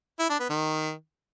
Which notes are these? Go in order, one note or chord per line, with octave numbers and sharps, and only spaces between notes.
E4
D4
B3
D#3